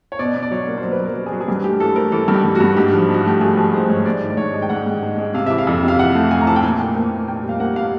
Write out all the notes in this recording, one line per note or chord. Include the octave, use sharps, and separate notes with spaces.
C#5
B2 D5
B2
D5
F#3 C#5
A#3
C5
F#3
B4
F#3
A#4
F#3
G#4
F#3
G#4
G2 G4
A3 G4
E3 A4
A3 A#4
E3 A4
G2
G4
G2
F#4
G2
G#2 G4
F3
G#2
F#4
A3 G4
A3 G#4
F3 G#4
G#2 C5
G#2 C#5
G#2 D5
D#3
D5
G#2 C#5
G#3
G5
G#2 F#5
G#2
G#3
G#3
C3 F5
E3 E5
F5
F2
C3
F5
E3 F#5
A3
A3 G#5
A#5
E3 A5
G5
A#2 G#5
A#3
A#3 G5
A#2
A#2 G5
G3
F5
A#3 F#5
A#3 F5